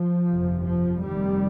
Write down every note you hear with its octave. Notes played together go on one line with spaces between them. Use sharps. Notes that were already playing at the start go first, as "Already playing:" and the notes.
Already playing: F3
G1 F2 C3
F3
F1 F2 C3 D#3 G3